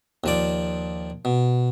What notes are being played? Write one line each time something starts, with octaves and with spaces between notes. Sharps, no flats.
D#2 F3 D5
B2